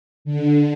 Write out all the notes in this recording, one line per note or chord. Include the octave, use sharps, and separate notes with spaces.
D3